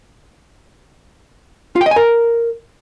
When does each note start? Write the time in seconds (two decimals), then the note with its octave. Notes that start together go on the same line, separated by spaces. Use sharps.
1.76 F4
1.81 G5
1.86 D#5
1.91 G#5
1.96 A#4